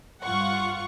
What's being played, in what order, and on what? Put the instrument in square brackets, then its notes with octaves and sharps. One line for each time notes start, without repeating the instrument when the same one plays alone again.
[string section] G2 F4 F5 F#5 C#6